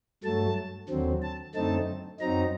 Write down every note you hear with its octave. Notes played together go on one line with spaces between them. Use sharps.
G2 F#3 A3 A5
D#2 D3 F#3 C4
A5
F#2 D3 A3 C4 D#4 A5
F#2 F#3 C4 D#4 A#5